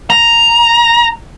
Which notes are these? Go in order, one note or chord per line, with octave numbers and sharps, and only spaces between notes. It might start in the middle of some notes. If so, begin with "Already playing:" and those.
A#5